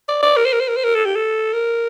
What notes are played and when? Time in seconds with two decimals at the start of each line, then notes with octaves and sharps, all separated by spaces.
0.09 D5
0.23 D5
0.37 A#4
0.45 C5
0.53 A#4
0.61 C5
0.69 A#4
0.77 C5
0.84 A#4
0.95 A4
1.05 G4
1.16 A4
1.53 A#4